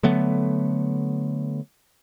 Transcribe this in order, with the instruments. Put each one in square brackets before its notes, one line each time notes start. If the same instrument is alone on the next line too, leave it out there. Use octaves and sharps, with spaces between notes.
[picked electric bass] D3 F#3 A3 B3